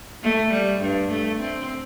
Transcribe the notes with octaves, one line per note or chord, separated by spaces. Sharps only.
A3
G3
G2
A3
C4